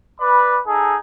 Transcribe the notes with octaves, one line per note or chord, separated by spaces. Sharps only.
B4 D5 B5
D#4 G#4 A4